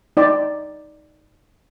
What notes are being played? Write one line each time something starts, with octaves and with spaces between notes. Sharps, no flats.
D#4 D5 G5